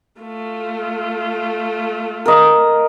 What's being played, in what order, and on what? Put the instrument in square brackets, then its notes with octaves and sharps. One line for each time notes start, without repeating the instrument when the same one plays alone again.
[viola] A3 F4
[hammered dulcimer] A#4 D#5